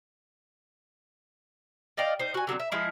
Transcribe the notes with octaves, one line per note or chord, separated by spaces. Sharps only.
D5 D#5 F5 G5
D#4 C5
F#4 G#5
D3 F#3 B3 C4
E5
F3 G#3 E4